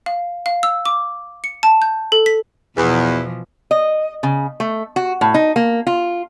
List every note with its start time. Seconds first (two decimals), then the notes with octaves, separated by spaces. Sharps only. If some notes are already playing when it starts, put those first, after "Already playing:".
0.06 F5
0.46 F5
0.63 E6
0.86 D6
1.44 C#7
1.63 A5
1.82 G6
2.12 A4
2.26 B6
2.77 E2 B2 E3 F3
3.71 D#5
4.23 C#3
4.60 A3
4.96 F#4
5.21 A2
5.34 D#4
5.56 A#3
5.87 F4